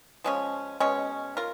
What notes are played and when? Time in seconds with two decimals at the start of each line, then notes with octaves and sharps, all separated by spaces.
0.24 F3 G#3 C#4
0.80 B2 G#3 C#4
1.37 F4 A#4